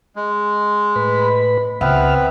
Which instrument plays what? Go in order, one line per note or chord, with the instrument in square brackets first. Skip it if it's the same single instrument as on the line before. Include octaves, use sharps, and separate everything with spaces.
[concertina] G#3
[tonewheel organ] A2 B4 B5
[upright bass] C#2 [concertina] B3 C4 B4 [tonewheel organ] E5 F#5 F6